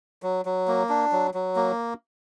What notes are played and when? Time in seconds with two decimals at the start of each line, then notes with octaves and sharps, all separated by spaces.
0.23 F#3
0.45 F#3
0.68 A#3
0.89 D4
1.12 F#3
1.34 F#3
1.56 A#3